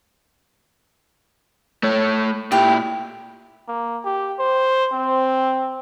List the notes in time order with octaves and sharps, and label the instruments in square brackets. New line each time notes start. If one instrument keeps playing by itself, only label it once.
[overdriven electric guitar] A3 C#5
[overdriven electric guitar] A#2 E4 [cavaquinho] G4
[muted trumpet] A#3
G4
C5
C4